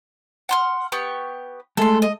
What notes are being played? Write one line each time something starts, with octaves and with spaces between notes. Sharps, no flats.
F#5 C6 F6
B3 G4 C#6
G#3 A3 A4 C6
D#5